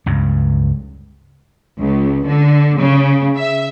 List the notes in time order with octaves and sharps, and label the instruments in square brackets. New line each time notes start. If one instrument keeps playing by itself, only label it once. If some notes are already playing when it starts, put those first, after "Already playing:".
[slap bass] C#2 G2
[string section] C#2
D3
C#3
E5